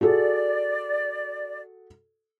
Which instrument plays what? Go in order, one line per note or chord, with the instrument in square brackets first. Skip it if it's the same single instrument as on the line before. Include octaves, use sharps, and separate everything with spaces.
[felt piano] F#4 G#4 A4 [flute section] D5